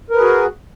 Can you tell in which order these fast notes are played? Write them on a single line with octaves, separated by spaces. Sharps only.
A#4 B4 G#4 F#4